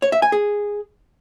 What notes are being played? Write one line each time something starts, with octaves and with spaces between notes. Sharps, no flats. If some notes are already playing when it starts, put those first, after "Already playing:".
C#5
E5
G#5
G#4